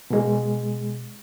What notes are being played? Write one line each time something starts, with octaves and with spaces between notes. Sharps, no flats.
B2 G#3